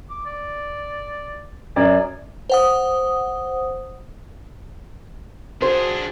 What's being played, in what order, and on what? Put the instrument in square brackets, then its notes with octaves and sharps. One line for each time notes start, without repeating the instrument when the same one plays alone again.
[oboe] D6
D5
[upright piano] F#2 D5 [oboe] G#5
[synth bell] C5 F#5 D#6
[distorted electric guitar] D4 G#4 [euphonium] F#4 [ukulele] C5